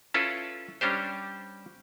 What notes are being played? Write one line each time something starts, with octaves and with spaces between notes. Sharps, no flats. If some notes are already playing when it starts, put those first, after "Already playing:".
C#4 E4 F4 A4 B4
G3 C#4 D4 G4 C5